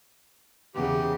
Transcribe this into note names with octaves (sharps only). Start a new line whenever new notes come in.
E2 C#3 G4